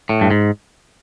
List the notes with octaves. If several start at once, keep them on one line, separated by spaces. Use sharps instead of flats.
A2
G2
G#2